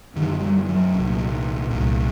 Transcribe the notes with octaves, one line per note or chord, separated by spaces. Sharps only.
F#2 D3 D#3
G3
F#3
C2 A#2
C2 A#2